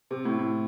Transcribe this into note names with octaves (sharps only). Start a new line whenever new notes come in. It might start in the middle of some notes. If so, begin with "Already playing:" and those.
C3
A2
A2